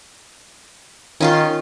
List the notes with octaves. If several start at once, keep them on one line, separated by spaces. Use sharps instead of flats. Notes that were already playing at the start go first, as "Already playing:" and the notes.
D#3 C#4 F4 C6